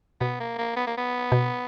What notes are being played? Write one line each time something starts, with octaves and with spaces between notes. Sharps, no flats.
B2 B3
A#3
A#3
B3
A#3
B3
B2